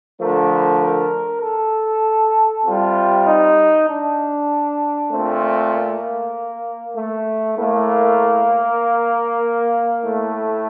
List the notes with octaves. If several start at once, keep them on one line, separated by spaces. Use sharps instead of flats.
D3 F3 A3 A#4
A#4
A4
C3 G3 F4
D#4
D4
A#2 A3 C4
A#3
A3
A2 A3 A#3
A2 A3